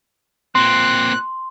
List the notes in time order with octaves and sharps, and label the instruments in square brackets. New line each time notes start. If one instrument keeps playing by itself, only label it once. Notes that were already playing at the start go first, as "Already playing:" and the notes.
[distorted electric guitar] A#2 C4 [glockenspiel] C6 [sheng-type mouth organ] F#6